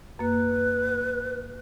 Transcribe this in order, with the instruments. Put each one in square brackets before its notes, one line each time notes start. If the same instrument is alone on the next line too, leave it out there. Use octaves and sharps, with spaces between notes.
[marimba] F#2 A#3 [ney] B4